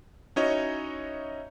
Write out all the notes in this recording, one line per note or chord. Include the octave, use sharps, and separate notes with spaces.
C#4 D#4 E4 F#4 C#5 D#5